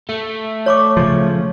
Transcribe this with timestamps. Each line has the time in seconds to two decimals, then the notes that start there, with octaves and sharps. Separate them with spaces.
0.09 A3
0.66 C#5 C#6 D6
0.97 C#3 F3